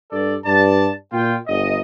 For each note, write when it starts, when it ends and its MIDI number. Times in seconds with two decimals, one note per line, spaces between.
0.12 0.35 43
0.12 0.35 69
0.12 0.35 74
0.45 0.89 43
0.45 0.89 74
0.45 0.89 81
1.13 1.35 46
1.13 1.35 65
1.13 1.35 79
1.47 1.79 31
1.47 1.79 75